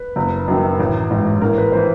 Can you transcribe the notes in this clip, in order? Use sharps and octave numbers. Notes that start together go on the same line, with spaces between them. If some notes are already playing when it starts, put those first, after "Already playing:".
Already playing: B4
F#1
F#2 D#3
A1
G#2 E3
A1 A#4
B4
E3 C5